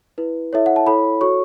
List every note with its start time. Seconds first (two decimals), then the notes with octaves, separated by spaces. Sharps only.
0.18 E4 B4
0.53 E4 A4 C#5 E5
0.66 F#5
0.76 A5
0.86 E4 A4 C#5 B5
1.21 F#4 A4 C#5 C#6